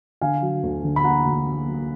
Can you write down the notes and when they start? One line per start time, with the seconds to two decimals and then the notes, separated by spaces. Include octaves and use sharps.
0.21 D3 F5 G#5
0.42 F#3
0.63 D2
0.83 D3
0.96 B5
1.04 A#3 F#5 A#5
1.25 D2
1.46 A#3
1.68 F#3